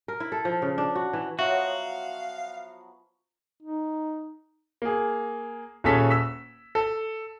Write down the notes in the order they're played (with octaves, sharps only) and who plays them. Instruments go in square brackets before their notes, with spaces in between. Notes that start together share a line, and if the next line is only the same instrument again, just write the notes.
[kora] A#4
E4
A4
F3
C#3
D4
F#4
E3
[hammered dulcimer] F3 F#3 B3 [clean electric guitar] F#4 [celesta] E5 [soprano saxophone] F5
[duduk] D#4
[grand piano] A#3 G#4
D#1 C#4 G#4 A4 B6
E6 B6
A4